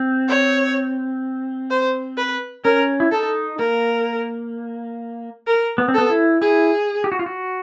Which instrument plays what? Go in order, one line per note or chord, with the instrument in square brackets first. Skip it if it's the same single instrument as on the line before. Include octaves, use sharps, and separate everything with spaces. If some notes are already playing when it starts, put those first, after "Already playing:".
Already playing: [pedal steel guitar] C4
[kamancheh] C#5
C5
B4
[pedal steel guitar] C#4 [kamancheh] A#4
[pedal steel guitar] E4
[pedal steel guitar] D#4 [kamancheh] A4
[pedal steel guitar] A#3 [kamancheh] A#4
[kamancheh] A#4
[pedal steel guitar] B3
C4
[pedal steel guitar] B3 [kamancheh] A4
[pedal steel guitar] E4
[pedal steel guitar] E4 [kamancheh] G#4
[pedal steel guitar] G4
F#4
F4
F#4